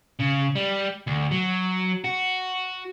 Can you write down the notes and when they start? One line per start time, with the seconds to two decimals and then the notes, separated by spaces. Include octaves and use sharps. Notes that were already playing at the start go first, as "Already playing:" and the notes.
0.19 C#3
0.55 G3
1.07 D2
1.31 F#3
2.04 F#4